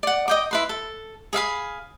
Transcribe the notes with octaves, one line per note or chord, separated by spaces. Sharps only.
D5 F#5
D#5 G5 D6
E4 B4 C6
A4
G#4 E5 F5 B5